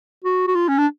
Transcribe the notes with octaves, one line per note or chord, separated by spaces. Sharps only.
F#4
F#4
F4
C#4
D4